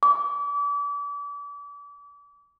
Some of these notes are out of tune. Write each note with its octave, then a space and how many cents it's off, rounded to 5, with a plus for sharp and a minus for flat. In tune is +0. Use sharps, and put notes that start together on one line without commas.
D6 -35